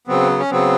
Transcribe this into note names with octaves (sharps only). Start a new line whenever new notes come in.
C#3 F#3 B3 C4
C#4
C#3 F#3 B3 C4